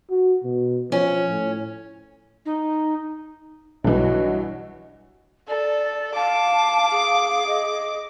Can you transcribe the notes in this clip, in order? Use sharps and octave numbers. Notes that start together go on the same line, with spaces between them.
F#4
B2
F3 C#4
A2
D#4
B1 G2 E3 F#4 C#5 D#5
A4 D5
F5 A5 D6
G#4
D#5